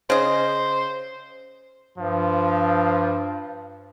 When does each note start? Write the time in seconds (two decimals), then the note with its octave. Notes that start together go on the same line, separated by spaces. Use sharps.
0.10 C#3 C5 D#5
1.98 G2 F3